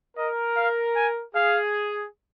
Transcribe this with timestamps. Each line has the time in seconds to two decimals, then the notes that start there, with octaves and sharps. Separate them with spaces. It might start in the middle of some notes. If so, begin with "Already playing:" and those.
0.17 A#4 D#5
0.56 F5
0.96 G#5
1.35 G#4 F5